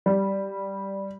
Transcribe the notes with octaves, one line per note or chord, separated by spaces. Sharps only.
G3